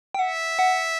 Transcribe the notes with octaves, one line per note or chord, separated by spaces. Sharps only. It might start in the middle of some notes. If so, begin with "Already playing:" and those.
G5
E5 F#5
F#5